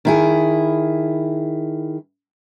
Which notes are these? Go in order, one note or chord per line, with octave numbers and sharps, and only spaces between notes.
D#3 E4 G#4